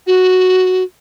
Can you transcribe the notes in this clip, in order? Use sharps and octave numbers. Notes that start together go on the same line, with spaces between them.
F#4